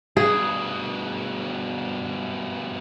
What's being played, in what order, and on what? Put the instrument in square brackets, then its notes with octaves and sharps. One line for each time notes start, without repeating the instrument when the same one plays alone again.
[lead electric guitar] G2 B2 [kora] G#4